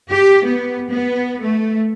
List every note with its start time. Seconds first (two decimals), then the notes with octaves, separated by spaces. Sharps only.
0.11 G4
0.46 B3
0.90 B3
1.41 A3